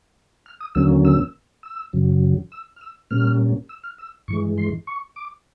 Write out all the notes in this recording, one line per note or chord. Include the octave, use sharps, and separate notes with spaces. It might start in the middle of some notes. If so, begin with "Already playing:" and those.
F6
D#6
D#2 D3 F#3 A#3 C#4 E6
E6
E6
F#2 C#3 F#3
E6
F6
E6
A#2 G3 A#3 C#4 F6
E6
F6
E6
G2 E3 G#3 C#6
C6
C#6
D6